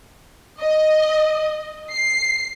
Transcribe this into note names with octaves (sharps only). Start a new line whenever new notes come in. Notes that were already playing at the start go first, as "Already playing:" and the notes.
D#5
C7